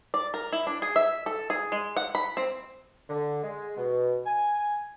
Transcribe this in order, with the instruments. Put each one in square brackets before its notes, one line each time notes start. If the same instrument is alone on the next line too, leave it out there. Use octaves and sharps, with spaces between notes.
[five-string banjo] D5
A#4
E4
D4
G#4
E5
A4
G#4
G#3
F#5
B5
C4
[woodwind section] D3
G#3
B2
G#5